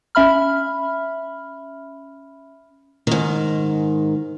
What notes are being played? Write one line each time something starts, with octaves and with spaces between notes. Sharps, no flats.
C#4 E5 B5 F6
G#2 D#3